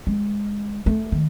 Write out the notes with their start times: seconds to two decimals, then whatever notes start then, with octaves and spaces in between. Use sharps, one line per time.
0.07 G#3
0.86 A3
1.12 D#3